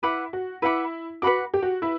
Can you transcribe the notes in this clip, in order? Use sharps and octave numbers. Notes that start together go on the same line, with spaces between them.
E4 B4 F#5 B5 D6
F#4
E4 B4 F#5 B5 D6
F#4 B4 F#5 B5 D6
G4
F#4
E4 B4